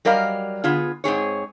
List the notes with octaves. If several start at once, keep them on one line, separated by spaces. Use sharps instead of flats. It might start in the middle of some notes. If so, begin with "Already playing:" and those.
F#3 G3 A#4 D5 D#5 F5
D3 B3 F4 G#4
G#2 C4 G#4 C#5